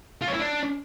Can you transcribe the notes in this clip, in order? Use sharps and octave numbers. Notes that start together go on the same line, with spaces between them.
F4
C#5
E4
D4